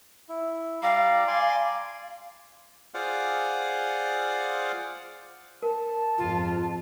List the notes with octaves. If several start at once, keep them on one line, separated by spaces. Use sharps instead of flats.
E4
G3 D5 F5 A#5
D5 G#5 C6
F4 G#4 C5 D5 F5 F#5
A#4 A5
F2 G#2 F4